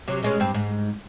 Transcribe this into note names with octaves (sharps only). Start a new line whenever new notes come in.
C3 F#3
B2 G#3 C#4
G2 C4
G#2